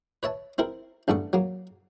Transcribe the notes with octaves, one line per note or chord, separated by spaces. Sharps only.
B4 C#5 E5 A5
C4 E4 A#4
A1 G2 B3 A4 C#6
F#3 A#3